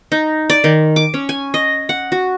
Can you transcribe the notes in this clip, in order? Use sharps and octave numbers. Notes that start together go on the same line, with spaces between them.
D#4
D5
D#3
D6
C#4
G#5
D#5
F#5
F#4